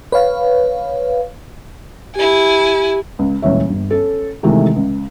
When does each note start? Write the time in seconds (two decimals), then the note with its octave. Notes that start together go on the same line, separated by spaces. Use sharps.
0.12 B4 C#5 F5
2.15 E4 G4 G#5
3.19 C#2
3.42 D#1 C#2 E3 C#5 E5
3.70 G1
3.91 C#4 A4
4.43 C3 D#3 E3 G#3 A3 E4
4.76 C#2